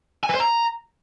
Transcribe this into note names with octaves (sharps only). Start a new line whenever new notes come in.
G#5
B4
C5
A#5